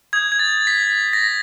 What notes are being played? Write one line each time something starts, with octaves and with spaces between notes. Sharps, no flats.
D#6 G6 G#6
G#6
A6
B6
A#6